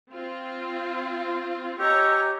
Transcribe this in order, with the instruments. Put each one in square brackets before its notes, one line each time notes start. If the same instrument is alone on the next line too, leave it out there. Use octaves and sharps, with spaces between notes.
[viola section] C4 F4
[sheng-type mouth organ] G4 [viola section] C#5 A#5 [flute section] D#5 G#5 E6